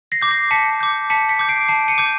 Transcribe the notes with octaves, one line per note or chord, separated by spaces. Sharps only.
A#6 C7
D6 G6
A#6 C7
A5 B6 C#7
D6 G6
A5 B6 C#7
B6 C#7
D6 G6
C7 D7
A5 C7 D7
C#7 D#7
D6 G6